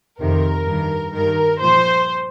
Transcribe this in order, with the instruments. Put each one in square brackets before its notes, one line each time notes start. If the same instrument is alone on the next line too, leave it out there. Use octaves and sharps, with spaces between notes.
[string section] F2 C3 D#3 A#4
G2 D#3
G2 D#3 A#4
A#2 F3 C5